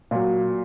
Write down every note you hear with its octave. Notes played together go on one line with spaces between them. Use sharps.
A#2 F#3